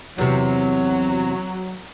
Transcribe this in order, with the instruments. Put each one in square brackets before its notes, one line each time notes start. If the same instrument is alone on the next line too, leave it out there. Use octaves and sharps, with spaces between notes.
[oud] E2 C3 [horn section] F#3